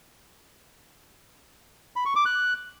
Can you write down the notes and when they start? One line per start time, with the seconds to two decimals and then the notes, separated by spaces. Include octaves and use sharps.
1.96 B5
2.06 C#6
2.16 D6
2.26 F#6